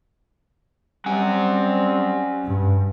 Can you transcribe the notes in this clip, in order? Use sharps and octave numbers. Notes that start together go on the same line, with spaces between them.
G3 C4 C#4 F#5 G#5
G2